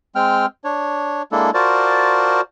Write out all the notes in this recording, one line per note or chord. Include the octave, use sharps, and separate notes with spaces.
G#3 C4 G5 F6
D4 C#5
G#3 A#3 D4 E4 A4
F4 F#4 A#4 C5 D5 A5